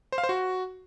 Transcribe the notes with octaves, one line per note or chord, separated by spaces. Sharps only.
C5
F5
C5
F#4